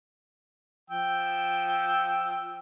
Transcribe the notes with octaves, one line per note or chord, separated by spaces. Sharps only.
F3 G5 E6